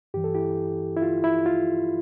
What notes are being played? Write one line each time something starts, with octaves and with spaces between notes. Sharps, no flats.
G2 E3 G4
A4
E4 G4
E4
F4
E4
F4